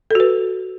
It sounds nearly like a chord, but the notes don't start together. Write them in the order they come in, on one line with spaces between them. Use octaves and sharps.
A4 F#4 B4